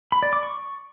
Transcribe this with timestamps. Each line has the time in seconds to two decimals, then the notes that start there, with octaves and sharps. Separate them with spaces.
0.12 B5
0.23 D5
0.33 D6
0.43 C#6